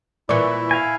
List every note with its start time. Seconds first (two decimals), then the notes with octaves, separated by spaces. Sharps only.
0.29 A#2 E3 E4 D5 C#6
0.71 F5 G#5